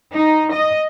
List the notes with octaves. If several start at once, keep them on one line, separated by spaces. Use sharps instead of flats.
D#4
D#5